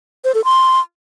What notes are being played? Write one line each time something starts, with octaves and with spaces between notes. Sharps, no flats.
C5
A4
C6